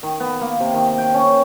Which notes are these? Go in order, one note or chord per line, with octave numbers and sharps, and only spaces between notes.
D#3
B3
A#3
C3
D#3
G5
C#4